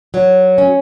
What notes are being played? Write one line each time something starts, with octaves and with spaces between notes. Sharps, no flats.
F#3
C#4